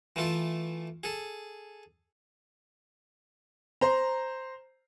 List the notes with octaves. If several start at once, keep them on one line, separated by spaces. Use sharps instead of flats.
E3 A3 F4 A4
G#4 A4
C5 A#5